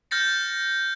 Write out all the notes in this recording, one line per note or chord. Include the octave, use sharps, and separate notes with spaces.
F6 G6 A6 A#6 C#7